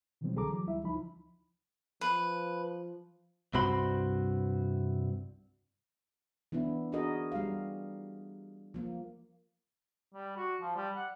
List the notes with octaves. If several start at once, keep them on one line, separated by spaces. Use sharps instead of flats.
B2 D#3 E3 F#3 G3 C4
C2 D3 G#4 A4 A#5 D6
E3 F#3
D2 G3 E4 E5
C#2 F3 D#4 B5
F3 B4
C2 G2 C4 F#4 B5 C6
E3 B3 D4 E4
D4 F#4 G#4 A#4 D#5
G3 F5
F3 A#3
G3
F#4
F3
G3
F#5